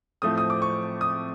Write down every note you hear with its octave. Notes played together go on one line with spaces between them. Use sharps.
A2 F3 A3 C4 D#6
D#6
D6
C#6
D#6